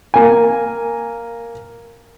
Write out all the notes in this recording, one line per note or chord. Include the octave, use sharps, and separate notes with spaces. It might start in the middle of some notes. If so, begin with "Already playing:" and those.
A#3 G#5